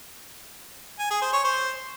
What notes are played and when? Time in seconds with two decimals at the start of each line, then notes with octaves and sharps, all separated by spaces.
0.99 G#5
1.10 G#4
1.22 C5
1.33 C#5
1.44 C5